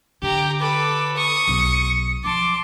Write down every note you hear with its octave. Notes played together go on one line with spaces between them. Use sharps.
D3 G4 A#5
A4 B4 D6
C#6 D#6 C#7
B1
F3 A5 C6 D6